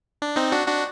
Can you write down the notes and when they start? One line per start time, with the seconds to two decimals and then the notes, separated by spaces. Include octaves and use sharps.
0.22 D4
0.36 C4 D#4
0.52 D4 F#4
0.67 D4 F#4